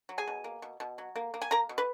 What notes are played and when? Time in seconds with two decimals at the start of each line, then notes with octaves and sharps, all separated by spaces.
0.09 F#3
0.18 G#4 G#5
0.27 B2
0.44 A#3
0.62 B2
0.80 B2
0.98 F#3
1.16 A#3
1.34 A#3
1.42 G#5
1.51 A#3 A#4 A#5
1.69 B2
1.78 B4